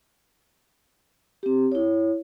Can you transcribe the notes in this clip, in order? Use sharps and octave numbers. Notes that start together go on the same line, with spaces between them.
C4 G4
E4 C#5